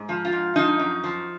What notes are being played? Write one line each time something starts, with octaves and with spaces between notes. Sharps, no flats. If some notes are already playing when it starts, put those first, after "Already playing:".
Already playing: G#2
F3
F4
G#2
F3 D#4
F#2
F3